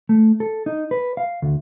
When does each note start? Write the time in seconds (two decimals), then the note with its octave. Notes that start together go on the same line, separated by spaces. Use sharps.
0.09 A3
0.40 A4
0.66 D#4
0.91 B4
1.17 F5
1.42 D2